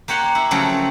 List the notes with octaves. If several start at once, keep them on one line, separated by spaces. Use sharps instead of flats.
A#3 G4 C#5 F#5 C6
E4
C#3 F3 F#3 A3 C4